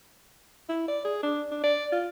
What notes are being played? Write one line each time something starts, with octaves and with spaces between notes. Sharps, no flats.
E4
D5
G#4
D4
D4
D5
F4